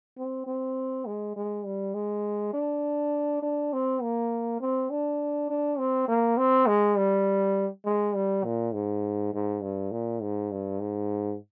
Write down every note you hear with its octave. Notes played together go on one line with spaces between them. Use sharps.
C4
C4
G#3
G#3
G3
G#3
D4
D4
C4
A#3
C4
D4
D4
C4
A#3
C4
G#3
G3
G#3
G3
A#2
G#2
G#2
G2
A#2
G#2
G2
G#2